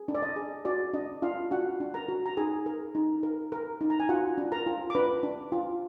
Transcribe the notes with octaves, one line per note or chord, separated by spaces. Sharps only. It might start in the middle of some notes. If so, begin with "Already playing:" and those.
Already playing: G#4
D4
D5
D#5
G#4
F#4 D5
D4 D#5
D4 F4 F5
D4 F#4 F#5
D4
A#4 A#5
F#4
A#5
D#4 G#4 G#5
A#4
D#4
A#4
A#4
D#4
A#5
G#5
F4 F#4 F#5
D4
A#4 A#5
F4
D6
D4 B4 B5
D4
F4